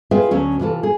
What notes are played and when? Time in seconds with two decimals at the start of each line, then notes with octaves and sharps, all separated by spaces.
0.11 F4 G#4 B4 E5 F5 G5
0.31 D2 F#3 C#4
0.60 C3 E3 F4 A4
0.83 G#4